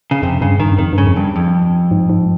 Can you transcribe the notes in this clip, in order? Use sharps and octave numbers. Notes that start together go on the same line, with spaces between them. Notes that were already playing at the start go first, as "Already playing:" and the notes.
C#3
F2 C3
G2 C#3
G2 D#3
F2 D#3
G2 C#3
F2
G2
F2
G#2
G#2